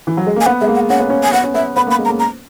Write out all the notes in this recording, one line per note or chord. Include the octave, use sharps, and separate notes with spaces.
E3
F#3
G#3
A#3 G#5
B3 F#5
G#3 E5
A#3
F#5
C#4 F#5
B3
C#4
G#5
B3 F#5
C#4
B3 E5
B3 B5
A#3 B5
G#3
A#5
A#3
A#5